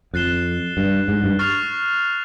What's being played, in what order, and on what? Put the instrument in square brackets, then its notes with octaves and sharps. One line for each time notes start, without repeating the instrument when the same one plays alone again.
[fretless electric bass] F2 [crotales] F#6 A6 C7 E7 G7
[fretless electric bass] G2
G#2
G2
[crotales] C#6 F6 A6 C7 F7